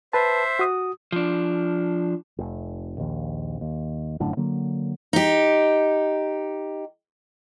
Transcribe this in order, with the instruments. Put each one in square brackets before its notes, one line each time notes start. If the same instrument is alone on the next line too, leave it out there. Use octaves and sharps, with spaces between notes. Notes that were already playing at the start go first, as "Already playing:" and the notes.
[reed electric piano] B4 A5 [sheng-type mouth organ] C5 E5
[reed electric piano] F#4 D#6
[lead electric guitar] F3 D4
[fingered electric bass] F1
A#1 D#2
D#2
G1 F#2 A2 D3
D3 F#3 A#3
[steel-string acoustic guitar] D#4 G4